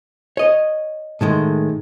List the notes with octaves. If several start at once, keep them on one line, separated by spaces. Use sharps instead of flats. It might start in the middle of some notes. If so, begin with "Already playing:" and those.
C#5 D#5
A2 D#3 G#3